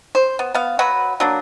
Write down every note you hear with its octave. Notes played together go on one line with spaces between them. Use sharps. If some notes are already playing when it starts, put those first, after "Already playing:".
C5
B3
B3 F5
F#3 F#4 B4
F#3 A#3 D4